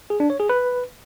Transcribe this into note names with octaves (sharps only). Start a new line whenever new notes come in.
G#4
D4
C#5
G#4
B4